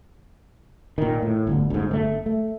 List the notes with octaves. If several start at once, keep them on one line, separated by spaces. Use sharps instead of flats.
A#2 D#3
A2
G1 D2 D3
D2 G#2
G1 D3 A3
A3